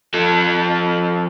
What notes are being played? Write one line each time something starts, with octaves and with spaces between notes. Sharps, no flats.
F3 A4